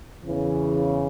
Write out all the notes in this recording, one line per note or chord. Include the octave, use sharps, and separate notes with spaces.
E2 C#3 E3